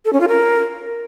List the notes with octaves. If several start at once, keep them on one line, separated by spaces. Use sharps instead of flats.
A4
C#4
F4
A#4